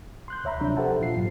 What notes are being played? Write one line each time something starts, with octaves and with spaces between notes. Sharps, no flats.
C6 F#6 G6
D2 C#5 E5 A#5 B5
C3 F3 F#3 D4
G4 A4 C5 E5 F#5 A5
A#2 F3 F4 C7
A1 G#2 F3 F#3